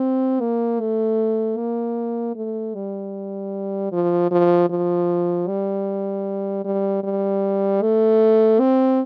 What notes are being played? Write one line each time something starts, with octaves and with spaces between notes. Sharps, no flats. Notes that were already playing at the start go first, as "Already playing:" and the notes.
Already playing: C4
A#3
A3
A#3
A3
G3
F3
F3
F3
G3
G3
G3
A3
C4